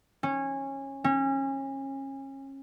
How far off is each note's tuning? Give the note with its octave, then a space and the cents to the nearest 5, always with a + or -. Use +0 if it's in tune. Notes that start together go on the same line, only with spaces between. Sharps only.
C#4 -20
C#4 -30